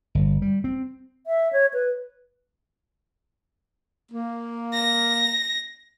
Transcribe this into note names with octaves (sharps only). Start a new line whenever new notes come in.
G1
G3
C4
E5
C#5
B4
A#3
A#6